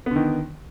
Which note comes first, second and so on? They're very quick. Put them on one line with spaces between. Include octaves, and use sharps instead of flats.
B3 D3 D#3